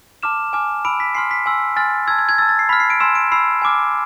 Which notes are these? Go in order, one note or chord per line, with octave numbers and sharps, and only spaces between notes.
A5 D6 F6 E7
G#5 D6 F6
B5 E6 D7
B6
G#5 C6 F6 C7
B6
G#5 C6 E6
G#5 C6 F6 A6
A5 E6 G#6
G#6
G#6
A5 E6 A6
A6
C7
B5 F6 B6
C7
D7
G#5 C6 E6 E7
D7
B5 E6 C7
G#5 D6 F6